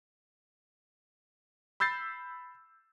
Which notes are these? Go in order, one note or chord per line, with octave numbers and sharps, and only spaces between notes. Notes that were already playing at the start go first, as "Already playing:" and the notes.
B5 E6 G6 A6 C7